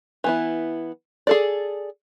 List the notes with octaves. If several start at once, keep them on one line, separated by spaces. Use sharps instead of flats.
E3 B3 E4
G#4 A4 D5